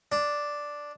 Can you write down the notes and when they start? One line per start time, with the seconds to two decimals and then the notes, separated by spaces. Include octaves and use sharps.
0.12 D4